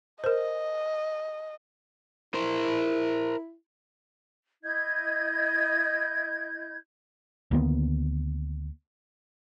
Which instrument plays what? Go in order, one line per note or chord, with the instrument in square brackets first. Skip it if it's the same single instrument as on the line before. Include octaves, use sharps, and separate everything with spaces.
[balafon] A#4 C5 [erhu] D#5
[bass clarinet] E4 [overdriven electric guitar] A#4 C5
[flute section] E4 D#5 G6 G#6
[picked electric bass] D2 D#3 A#3 B3